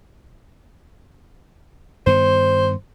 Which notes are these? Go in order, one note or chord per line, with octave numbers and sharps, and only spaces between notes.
G2 D#3 B3 C5